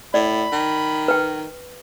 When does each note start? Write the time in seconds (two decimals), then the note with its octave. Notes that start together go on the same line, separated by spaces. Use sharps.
0.14 A2 D5 B5
0.52 D#3
1.08 B4 G5